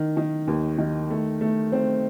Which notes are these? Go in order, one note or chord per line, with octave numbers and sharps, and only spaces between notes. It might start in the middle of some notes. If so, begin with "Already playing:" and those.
Already playing: D#3
D#3
D#2
D#3
A3
A3
C4